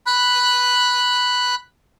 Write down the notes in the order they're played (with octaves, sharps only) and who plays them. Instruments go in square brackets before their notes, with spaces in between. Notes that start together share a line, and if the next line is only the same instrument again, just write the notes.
[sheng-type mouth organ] B5 F#6